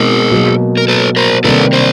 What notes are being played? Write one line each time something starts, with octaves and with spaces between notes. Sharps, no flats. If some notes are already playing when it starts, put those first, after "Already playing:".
Already playing: B2 G#3 C4 D#4 G#4 A#4
B2 F#3 A#3
A#4
A4 B4
A#4 C5
C3 D#3 G3 A#3 D4 A4 B4
A#4 C5